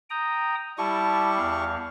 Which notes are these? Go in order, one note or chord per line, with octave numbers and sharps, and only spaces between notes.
G5 A#5 D#6
G3 E4 G4 A5 C#6
E2 F5